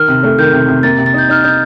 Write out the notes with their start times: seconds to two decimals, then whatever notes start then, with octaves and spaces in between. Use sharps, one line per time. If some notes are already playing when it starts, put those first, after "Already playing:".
Already playing: D#3 F6
0.08 C3
0.23 A3
0.38 D#3 G6
0.53 C3
0.68 C3
0.83 A#3 A6
0.98 C3
1.06 A6
1.14 D#4 G6
1.29 D#4 F6
1.44 D#4 G6